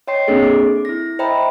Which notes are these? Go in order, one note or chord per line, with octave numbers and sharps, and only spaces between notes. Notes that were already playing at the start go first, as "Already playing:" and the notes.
C#5 D#5 G5 C6 C7
A#3 C4 D4 G#4 A4
D6
E4 A#6
C5 D#5 E5 G5 A#5 B5